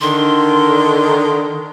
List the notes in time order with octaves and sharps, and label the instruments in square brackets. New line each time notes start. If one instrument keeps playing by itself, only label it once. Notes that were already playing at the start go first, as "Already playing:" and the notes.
[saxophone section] D3 D#3 [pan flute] C6